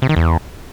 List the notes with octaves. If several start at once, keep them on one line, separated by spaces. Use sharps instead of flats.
C3
D#3
E2